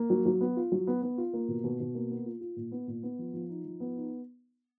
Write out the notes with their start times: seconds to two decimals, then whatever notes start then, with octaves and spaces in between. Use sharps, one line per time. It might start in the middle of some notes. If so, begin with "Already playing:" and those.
Already playing: A#3
0.10 F#3
0.26 F#3
0.41 B3
0.57 F4
0.72 F#3
0.87 B3
1.02 B3
1.18 F4
1.33 A#3
1.48 B2
1.64 B2
1.80 B2
1.95 A#3
2.10 B3
2.26 F4
2.41 F4
2.56 A#2
2.72 B3
2.87 A#2
3.03 B3
3.19 F3
3.33 F3
3.49 D#4
3.65 F3
3.80 B3
3.96 D#4